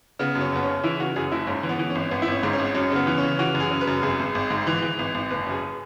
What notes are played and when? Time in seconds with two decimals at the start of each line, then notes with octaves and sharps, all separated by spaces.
0.19 C#3 B3
0.35 F#2
0.41 C#4
0.52 F#1 B3
0.63 C#3 C#4
0.84 E3 E4
0.99 C#3 F#4
1.16 F#2 G#4
1.32 F#1 E4
1.47 G#2 C#4
1.63 E3
1.69 B3
1.79 E3
1.90 C#4
1.95 G#1
2.11 G#1 B3
2.22 E4
2.28 G#1 C#4
2.43 G#2
2.53 C#4
2.59 G#1
2.75 F#2 C#4
2.92 C#3 B3
3.07 E3
3.18 C#4
3.23 C#3
3.39 E3 F#4
3.55 F#2
3.60 G#4
3.71 C#3
3.81 B4
3.87 F#2
4.02 G#1 G#4
4.19 G#1
4.35 G#1
4.50 G#2
4.67 E3
4.82 E3
4.99 G#1
5.14 G#1
5.31 F#1 B4
5.47 F#2 G#4